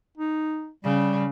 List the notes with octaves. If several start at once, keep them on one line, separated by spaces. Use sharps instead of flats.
D#4
C#3 G3